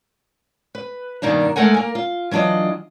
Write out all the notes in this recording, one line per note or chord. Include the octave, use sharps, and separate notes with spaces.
B4
G2 B2 D#3 A#3 D4 A#5
G#3 A3 A4 A#4 F#5 G#5
A#3 A#4
F4
E3 F#3 D4 F4 D#5